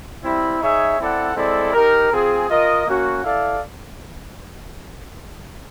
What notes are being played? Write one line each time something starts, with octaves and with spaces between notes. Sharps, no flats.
G3 C4 E4
D#4 G#4 C#5 E5
C4 E4 A4 D5 F#5
G#3 C4 E4 A4 D5
D#4 G4 A#4
C4 F4 G#4
F4 A#4 D#5
A#3 C#4 F#4
E4 A4 D5 F5